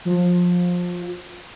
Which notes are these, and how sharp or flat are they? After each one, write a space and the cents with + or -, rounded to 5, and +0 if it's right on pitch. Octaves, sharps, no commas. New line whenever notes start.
F3 +20